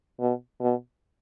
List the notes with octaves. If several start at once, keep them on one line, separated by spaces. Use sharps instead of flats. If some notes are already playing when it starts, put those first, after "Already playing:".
B2
B2